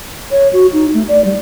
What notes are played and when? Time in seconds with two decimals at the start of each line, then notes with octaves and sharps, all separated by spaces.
0.31 C#5
0.53 F#4
0.73 D#4
0.94 A3
1.08 D5
1.25 G3